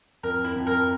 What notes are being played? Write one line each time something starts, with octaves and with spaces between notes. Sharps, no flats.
F2 A#4
E4
F2
A#4